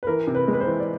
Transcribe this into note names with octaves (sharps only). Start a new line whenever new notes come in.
B4
E3 A#4
C3
B4
G#3
B4
C5
E3
D5